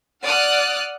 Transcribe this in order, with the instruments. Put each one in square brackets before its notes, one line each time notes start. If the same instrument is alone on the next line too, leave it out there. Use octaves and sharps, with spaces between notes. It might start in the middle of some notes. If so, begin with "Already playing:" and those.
[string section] D5 F#5 D#6 F6 F#6